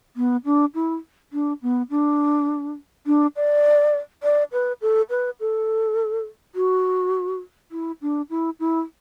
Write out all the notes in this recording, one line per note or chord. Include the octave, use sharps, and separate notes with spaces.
B3
D4
E4
D4
B3
D4
D4
D5
D5
B4
A4
B4
A4
F#4
E4
D4
E4
E4